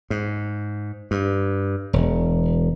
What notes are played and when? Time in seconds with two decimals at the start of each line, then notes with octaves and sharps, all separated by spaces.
0.10 G#2
1.11 G2
1.93 E1